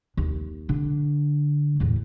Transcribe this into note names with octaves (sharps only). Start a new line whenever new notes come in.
D#2
D3
E2 A2